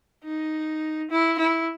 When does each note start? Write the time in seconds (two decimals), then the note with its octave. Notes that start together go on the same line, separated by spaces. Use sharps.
0.24 D#4
1.11 E4
1.38 E4